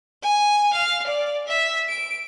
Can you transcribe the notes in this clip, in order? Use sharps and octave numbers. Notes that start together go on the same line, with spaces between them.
G#5
F5
D5
E5
D7